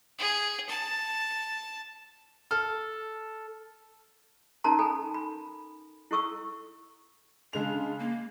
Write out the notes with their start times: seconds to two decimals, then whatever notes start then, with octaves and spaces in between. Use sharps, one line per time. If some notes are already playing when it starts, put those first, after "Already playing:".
0.18 G#4
0.69 A5
2.51 A4 F6
4.64 C#4 D#4 A#4 A5 A#5 C6
4.79 A4 G#5 B5
5.14 B5
6.11 E4 A4 C#6 E6
7.53 C#3 G#3 D4 F7
7.99 A#3